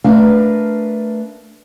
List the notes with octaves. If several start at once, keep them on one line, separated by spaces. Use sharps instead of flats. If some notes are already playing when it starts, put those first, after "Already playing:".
A3 D4 A#4 B4 F5